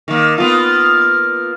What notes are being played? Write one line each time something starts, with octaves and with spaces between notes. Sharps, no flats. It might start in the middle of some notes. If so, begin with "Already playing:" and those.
D#3 A#3
A#3 B3 F4